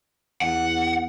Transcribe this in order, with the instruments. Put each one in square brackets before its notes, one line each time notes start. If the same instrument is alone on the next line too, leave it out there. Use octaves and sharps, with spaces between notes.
[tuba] E2 [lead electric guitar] F#5